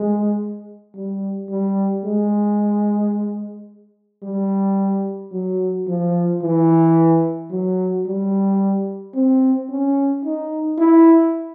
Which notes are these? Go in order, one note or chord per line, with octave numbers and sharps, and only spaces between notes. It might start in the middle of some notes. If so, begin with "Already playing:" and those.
Already playing: G#3
G3
G3
G#3
G3
F#3
F3
E3
F#3
G3
C4
C#4
D#4
E4